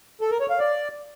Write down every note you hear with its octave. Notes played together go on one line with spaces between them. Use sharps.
A4
A#4
C#5
F5
D5